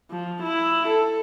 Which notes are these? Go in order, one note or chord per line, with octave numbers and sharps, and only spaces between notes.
F3
E4
A4